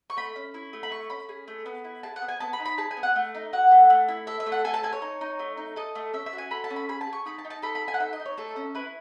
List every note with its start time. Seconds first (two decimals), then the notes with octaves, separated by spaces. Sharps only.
0.10 C#6
0.17 A3 B5
0.36 C#4
0.54 E4
0.73 A3
0.83 B5
0.91 A3 C#6
1.10 C#4 B5
1.29 G#4
1.48 A3
1.66 B3
1.85 E4
2.03 G#4 A5
2.16 F#5
2.22 B3
2.29 G#5
2.40 B3 A5
2.53 B5
2.60 D#4
2.65 B5
2.78 G#4 A5
2.91 G#5
2.97 B3
3.03 F#5
3.16 A3
3.35 D#4
3.53 F#4 F#5
3.71 A3
3.90 A3
4.08 E4
4.27 A4 E5
4.40 E5
4.46 A3
4.52 F#5
4.64 A4 G#5
4.74 A5
4.83 A4 G#5
4.93 C#5
5.02 D#4
5.21 D#4
5.39 A3
5.57 D#4
5.76 A4 D#5
5.95 A3
6.13 C#4 E5
6.26 E5
6.33 F#4
6.38 G#5
6.51 A4 B5
6.64 A5
6.70 C#4
6.76 B5
6.89 G#4 B5
7.01 A5
7.07 G#4
7.13 C#6
7.26 D#4 B5
7.38 A5
7.45 D#4
7.50 A5
7.62 A4 B5
7.75 B5
7.82 A4
7.88 G#5
7.94 F#5
8.00 D#4 E5
8.13 D#5
8.20 D#4
8.26 C#5
8.37 A3 A4
8.56 C#4
8.75 E4 B4